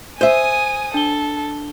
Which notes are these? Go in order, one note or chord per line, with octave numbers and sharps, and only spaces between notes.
C5 E5 G#5 D#6
D4 A4 G7